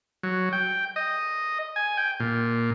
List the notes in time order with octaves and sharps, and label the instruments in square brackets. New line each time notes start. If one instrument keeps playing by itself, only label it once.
[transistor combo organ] F#3
G5
D#5
G#5
G5
A#2